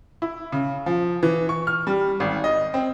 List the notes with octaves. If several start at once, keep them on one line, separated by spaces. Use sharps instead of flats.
E4
C#3
F3
E3
C#6
F6
G3
G#1
D#5
C4